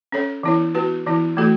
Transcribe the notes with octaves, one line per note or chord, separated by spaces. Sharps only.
C#4 A4 C#5
E3 B3 E4 C#5
B3 F#4 B4
E3 B3 E4
E3 A3 F#4 A4